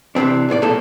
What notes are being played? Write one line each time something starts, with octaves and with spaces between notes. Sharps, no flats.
C3 E3 G#3 C4 D4
C2 A2 F4 D5
B1 A#2 A3 A#3 A4